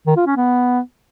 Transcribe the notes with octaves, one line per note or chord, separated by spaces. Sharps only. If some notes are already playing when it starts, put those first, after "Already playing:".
D#3
F4
C#4
B3